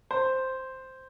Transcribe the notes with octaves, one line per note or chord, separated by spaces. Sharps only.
C5